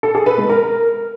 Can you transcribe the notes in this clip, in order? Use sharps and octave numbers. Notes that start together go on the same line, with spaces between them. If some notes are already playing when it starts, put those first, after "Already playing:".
A4
G#4
B4
G#3
A#4